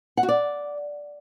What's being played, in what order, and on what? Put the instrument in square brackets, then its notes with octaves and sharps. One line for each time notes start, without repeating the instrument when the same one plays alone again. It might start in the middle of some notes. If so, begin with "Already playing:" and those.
[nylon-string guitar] F#5
F#4
D5